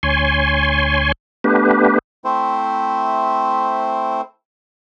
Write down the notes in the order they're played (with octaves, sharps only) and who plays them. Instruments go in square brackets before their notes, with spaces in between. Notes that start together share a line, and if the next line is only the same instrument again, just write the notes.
[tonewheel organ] D2 C#5 G#5 C6
A3 B3 D4 G4 B4
[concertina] A3 C4 E4 C5